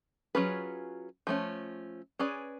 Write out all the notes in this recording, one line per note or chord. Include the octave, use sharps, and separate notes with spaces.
F#3 C#4 F4 G#4 B4
F3 A3 C#4
C#4 G#4 B4 D5